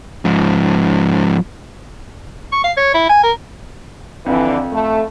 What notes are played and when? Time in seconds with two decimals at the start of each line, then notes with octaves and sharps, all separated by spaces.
0.25 G#2 F3
2.52 C#6
2.64 F5
2.77 C#5
2.94 E4
3.09 G#5
3.24 A#4
4.26 F2 D3 E3
4.72 A3